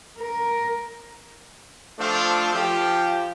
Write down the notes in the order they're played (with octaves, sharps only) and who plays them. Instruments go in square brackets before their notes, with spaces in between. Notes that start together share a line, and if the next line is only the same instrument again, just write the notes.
[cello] A#4
[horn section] F3 A3 C4 D4 F4
F3 G4